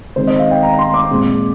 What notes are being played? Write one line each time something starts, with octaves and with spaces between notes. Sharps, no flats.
D#3 G#3 C4 C5
D#5
F5
G5
A#5
A#5
C6
D6
A#2 G#3 C4